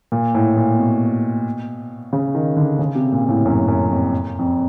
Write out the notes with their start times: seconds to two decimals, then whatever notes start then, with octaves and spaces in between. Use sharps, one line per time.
0.12 A#2
0.35 A2
0.57 A#2
0.79 B2
2.13 C#3
2.35 D#3
2.57 D3
2.79 C#3
2.95 C3
3.12 A#2
3.29 A2
3.45 F#2
3.68 F#2
3.90 F2
4.39 F2